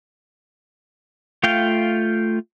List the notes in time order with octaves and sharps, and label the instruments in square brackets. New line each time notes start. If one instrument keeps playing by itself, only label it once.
[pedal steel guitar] A3 F4 F5 G5